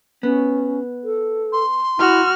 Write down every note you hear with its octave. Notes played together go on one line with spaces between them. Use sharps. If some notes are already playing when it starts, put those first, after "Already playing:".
B3 C#4
A4
C6
E4 F#4 F6